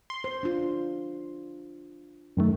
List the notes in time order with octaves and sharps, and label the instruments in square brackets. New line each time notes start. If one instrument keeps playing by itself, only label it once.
[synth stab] C6
[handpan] C5
D4 F4
[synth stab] F#2 D#3 A3